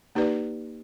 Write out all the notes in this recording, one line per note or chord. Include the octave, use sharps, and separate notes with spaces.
A#3 D#4 G4 B4 D5